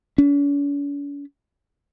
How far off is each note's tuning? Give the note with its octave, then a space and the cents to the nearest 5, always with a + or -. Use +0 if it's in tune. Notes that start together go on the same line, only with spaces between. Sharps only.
C#4 +45